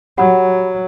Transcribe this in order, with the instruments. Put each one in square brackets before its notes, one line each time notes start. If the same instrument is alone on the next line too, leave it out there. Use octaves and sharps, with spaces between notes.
[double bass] F#3 [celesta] G4 F#5 B5